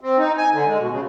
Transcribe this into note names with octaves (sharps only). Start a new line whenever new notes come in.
C4
D#4
G#5
D3
G#3
B2
C#3